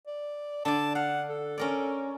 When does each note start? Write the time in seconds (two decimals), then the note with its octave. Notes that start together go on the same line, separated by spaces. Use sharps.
0.07 D5
0.65 D3 D5 A5
0.95 F5 F#5
1.29 A4
1.58 C#4 A#4 D5